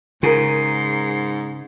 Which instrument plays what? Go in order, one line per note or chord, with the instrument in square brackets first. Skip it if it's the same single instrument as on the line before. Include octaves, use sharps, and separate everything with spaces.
[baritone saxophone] G#2 [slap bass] C#3 [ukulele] G#4 A#4 [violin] C7